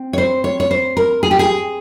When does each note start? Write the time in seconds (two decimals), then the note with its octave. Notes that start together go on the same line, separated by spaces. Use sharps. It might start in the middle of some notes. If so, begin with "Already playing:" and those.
Already playing: C4
0.13 C#5
0.18 C5
0.44 C#5
0.60 C#5
0.71 C5
0.97 A#4
1.23 G#4
1.31 G4
1.39 G#4